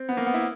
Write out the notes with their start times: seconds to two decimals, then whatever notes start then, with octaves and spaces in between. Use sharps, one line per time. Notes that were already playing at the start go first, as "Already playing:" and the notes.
Already playing: C4
0.09 B3
0.17 A#3
0.26 B3
0.34 E4